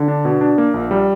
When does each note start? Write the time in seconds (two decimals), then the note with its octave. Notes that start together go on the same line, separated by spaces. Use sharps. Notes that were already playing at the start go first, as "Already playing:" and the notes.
Already playing: D3
0.08 D4
0.25 B2
0.41 D4
0.58 A#3
0.74 A#1
0.91 G3